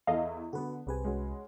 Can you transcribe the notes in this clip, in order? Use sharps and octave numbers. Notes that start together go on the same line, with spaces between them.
E2 E4 A4 D#5 F5
D3 B3 F#4 B4
C2 C4 G4 G#4 B4 G#5
G#3 C#4 F#4